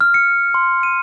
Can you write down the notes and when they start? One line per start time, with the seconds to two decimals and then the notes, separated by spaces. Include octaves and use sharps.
0.01 F6
0.14 C#7
0.54 C6
0.83 D#7